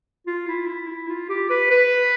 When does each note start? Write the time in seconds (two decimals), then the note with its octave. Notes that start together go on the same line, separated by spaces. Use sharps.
0.27 F4
0.48 E4
0.68 E4
0.88 E4
1.09 F4
1.29 G4
1.50 B4
1.70 B4